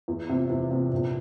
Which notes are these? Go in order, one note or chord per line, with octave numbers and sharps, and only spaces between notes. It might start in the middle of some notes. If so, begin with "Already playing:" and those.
E2
C3 F3
E2
C3 F3
A#1